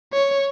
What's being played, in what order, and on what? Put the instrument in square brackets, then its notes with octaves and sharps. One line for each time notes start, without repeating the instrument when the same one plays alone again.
[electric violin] C#5